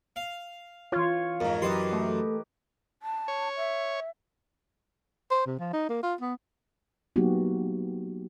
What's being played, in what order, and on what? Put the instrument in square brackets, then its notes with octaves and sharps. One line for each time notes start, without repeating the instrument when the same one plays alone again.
[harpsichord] F5
[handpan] E3 C#5 [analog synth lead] F4
[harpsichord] F2 G#2 [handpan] A#4
[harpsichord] F#2 E3 C6 [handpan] G4 B4 D#5
[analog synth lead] A3
[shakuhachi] A5
[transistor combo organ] C#5
[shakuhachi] E5
[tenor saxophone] C5
C3
F3
D#4
A#3
F4
B3
[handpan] F#3 A#3 B3 D#4 F#4 G4